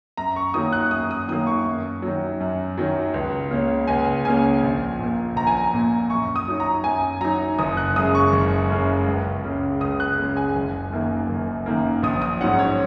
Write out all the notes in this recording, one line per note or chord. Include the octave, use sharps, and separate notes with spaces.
F#2 A#5
C#6
D#3 F#3 A#3 D#6
F#6
F#2 D#6
D#6
D#3 F#3 A#3 D#6
C#6
F#2
D#3 F#3
F#2
D#3 F#3
C#2
C#3 A#3 C#4
C#2 G#5
C#3 A#3 C#4 G#5
A#1
A#2 A#3
A#1 A#5
G#5
A#5
A#2 A#3
F#2 C#6
D#6
F#3 D#4
A#5
F#2 G#5
F#3 D#4 A#5
F#1 D#6
F#6
F#2 C#3 G#3 D#6
C#6
F#1
F#2 C#3 G#3
C#2
C#3 G#3
C#2 D#6
F#6
C#3 G#3
G#5
F#1
F#2 D#3 A#3
F#1
F#2 D#3 A#3
A#1 D#6
D#6
G#2 F#3 C#4 F#5
C#5